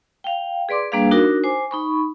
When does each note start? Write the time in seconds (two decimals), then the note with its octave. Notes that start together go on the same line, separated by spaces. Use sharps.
0.24 F5 G5
0.69 G#4 B4 D5 C6 D6
0.92 G3 A#3 D4 G#4 B4 F5
1.11 D4 D#4 F#4 A#4
1.44 C5 G#5 D6
1.71 D#4 B5 C#6